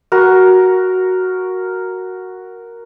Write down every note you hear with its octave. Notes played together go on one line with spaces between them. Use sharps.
F#4 A#4